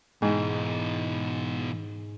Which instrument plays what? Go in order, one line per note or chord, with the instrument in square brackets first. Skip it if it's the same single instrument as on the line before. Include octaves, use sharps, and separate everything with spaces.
[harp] G#2 [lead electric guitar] B2 E3